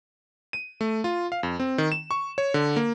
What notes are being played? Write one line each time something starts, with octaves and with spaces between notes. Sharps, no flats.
D#7
A3
F4
F5
F2
C4
D#3
E7
C#6
C#5
D3
A#3